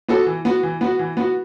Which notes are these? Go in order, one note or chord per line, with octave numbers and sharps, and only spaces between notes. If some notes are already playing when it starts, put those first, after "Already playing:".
B3 F#4 A4
E3
B3 F#4
E3
B3 F#4
E3
B3 F#4